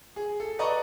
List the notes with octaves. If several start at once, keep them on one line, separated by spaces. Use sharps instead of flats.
G#4
A4
B4 D5 D#5 A#5 C#6 D#6